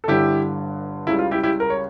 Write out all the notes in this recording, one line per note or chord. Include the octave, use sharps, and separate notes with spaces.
A4
G1 G2 D3 E4 G4
C#2 C#3 G3 E4
F4
E4 G4
E4 G4
A#4
C#5